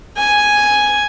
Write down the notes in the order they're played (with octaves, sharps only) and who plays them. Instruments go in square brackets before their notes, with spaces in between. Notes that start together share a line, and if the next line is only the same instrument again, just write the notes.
[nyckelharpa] G#5